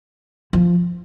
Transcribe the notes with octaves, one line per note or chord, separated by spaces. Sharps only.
F3